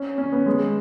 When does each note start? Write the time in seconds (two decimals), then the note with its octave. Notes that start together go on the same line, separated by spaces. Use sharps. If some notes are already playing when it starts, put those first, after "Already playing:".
Already playing: C#4
0.18 C#4
0.32 B3
0.46 G#3